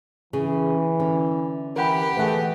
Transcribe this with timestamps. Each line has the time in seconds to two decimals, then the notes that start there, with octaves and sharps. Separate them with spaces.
0.33 C#3 E3 G#4
0.99 D3 C#4
1.76 E3 G4 A#4 F#5 B5
2.17 D3 E3 A3 G#4 B4 F#5